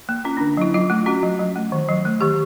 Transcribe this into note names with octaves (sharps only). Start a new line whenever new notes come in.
A#3
C#4 F4
D4
D3
F#3 E4
F#3 F4
A3 F4
C#4 F#4
F#3
F#3
A3
D#3
F#3
A3
D#3 G4